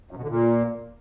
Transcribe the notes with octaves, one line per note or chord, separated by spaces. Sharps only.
F#2
B2
D3
A#2